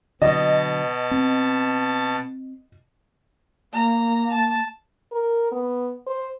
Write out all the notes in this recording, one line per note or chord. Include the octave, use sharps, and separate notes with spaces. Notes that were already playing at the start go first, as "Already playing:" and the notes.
B2 D3 F#3 D#5 A5
C4
A#3 A#5
A5
A#4
B3
C5